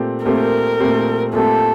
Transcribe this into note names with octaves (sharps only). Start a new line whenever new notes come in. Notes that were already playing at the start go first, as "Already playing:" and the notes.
Already playing: A#2 A3 C4 G4
A#2 A3 C4 G4 A#4
A#2 A3 C4 G4
A#2 A3 C4 G4 A4